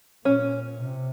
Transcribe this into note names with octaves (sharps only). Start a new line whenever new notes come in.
A#2 C#4
C3